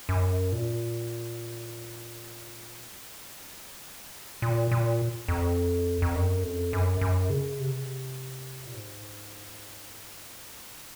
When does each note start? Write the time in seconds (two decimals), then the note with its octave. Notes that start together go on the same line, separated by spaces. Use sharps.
0.09 F#2
0.53 A#2
4.42 A#2
4.71 A#2
5.28 F2
6.02 F2
6.15 F#2
6.43 F2
6.73 F#2
7.01 F#2
7.30 C#3
7.60 C3
8.66 A#2
8.74 G#2